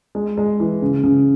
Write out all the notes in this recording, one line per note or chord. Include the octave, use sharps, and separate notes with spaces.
G#3
G#3
E3
C#3
C#3